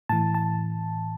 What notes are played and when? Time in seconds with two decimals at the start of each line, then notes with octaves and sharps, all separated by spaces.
0.09 A2 E3 A5
0.34 A5